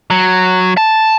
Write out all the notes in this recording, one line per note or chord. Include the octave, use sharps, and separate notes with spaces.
F#3
A5